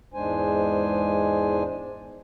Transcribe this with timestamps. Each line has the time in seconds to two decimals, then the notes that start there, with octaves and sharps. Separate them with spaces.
0.14 E2 G#2 G#3 D4 C5 G#5